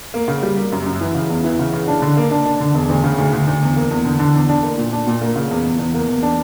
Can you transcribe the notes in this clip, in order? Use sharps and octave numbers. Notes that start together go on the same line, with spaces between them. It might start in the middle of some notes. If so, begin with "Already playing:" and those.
A#3
C#3
G3
A#3
F#2
F#2
E3
C#3
E2
E3
C#3
C#3
D4
D3
A#3
D4
D4
D3
E1
D2
C#3
D2
D2
D2
E2
A#3
E2
D3
D3
E2
D4
A#3
A#2
D4
A#2
A#3
C#3
E2
E2
E2
A#3
E2
D4